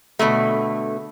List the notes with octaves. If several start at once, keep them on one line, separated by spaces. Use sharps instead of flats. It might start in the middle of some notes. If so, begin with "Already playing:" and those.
B2 D3 G#3 A3